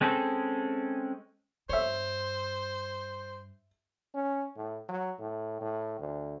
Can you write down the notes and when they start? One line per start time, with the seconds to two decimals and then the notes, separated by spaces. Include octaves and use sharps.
0.01 G#3 C4 C#4 G#4 A4
1.69 G2 C5 C#5 E5
4.15 C#4
4.56 A2
4.88 F#3
5.19 A2
5.61 A2
5.99 D2